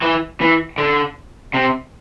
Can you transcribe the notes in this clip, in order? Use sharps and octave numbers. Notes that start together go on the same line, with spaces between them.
E3
E3
D3
C3